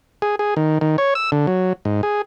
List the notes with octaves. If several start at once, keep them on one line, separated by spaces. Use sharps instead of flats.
G#4
G#4
D#3
D#3
C#5
E6
D3
F#3
G#2
G#4